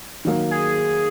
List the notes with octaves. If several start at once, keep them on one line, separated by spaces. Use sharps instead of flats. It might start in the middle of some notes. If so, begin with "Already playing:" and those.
D#3 F#3 A#3
G#4